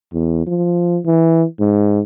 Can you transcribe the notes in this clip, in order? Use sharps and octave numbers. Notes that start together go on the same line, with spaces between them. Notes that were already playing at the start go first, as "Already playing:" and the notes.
E2
F3
E3
G#2